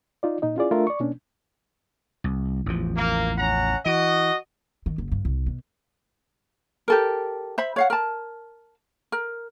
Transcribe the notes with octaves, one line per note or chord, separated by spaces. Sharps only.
D#4 F4 D5
A#2 D#4 D#5
C#4 E4 F4 G#4 D5
A3 D4 F4 A#4 E5
D5 C#6
B2 A#3 C#4 D4
C2
A1 E2 F3
A#3
C#4 F#5 A#5
E3 F#4 D#5
D#3
F#1
G2
C2
B2
G4 A4 A#4
C5 E5 B5
C#5 F5 F#5
A#4 A5
A#4